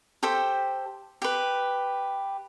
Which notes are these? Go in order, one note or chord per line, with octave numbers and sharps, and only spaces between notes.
G4 A4 C5 G5
G4 B4